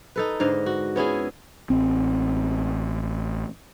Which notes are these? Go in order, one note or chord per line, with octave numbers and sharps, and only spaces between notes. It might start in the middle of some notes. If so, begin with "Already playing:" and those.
D#4 A4 B4
G#2 D3 D#5 F5
F#4
B3 C#4 E4 G#4
A1 C4